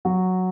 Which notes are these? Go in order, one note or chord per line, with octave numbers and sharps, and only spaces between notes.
F#3 F#4